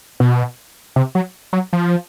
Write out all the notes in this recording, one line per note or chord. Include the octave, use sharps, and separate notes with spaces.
B2
C3
F#3
F#3
F3